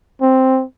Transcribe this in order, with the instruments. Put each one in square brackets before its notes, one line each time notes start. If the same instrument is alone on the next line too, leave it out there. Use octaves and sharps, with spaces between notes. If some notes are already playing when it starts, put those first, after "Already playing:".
[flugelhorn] C4